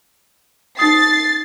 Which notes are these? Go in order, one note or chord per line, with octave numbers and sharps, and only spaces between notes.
D#4 D#6 A6 C7